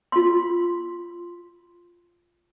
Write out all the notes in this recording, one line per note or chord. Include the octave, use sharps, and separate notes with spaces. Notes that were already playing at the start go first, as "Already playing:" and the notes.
F4 C6